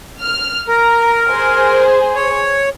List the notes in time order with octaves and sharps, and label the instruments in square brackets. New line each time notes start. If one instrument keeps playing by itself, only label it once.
[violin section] F6
[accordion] A#4 [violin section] A#5
[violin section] G#4 C5
[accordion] C#5